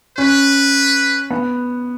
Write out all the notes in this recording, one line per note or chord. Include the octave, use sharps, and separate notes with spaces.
C#4 B4
B3